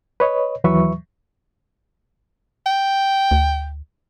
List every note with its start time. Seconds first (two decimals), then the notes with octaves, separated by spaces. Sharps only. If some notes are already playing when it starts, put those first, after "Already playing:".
0.20 B4 C#5 D#5
0.64 D#2 E3 F#3 B4 E5 C#6
2.66 G5
3.31 D2